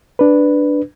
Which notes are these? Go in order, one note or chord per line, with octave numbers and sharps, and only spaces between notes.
D4 B4